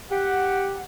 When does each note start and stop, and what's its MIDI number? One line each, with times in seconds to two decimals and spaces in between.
0.10 0.81 67
0.10 0.81 78